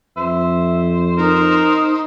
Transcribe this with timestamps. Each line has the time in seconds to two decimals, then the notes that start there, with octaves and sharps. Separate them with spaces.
0.17 F2 C5 E5
1.18 D#4 A#4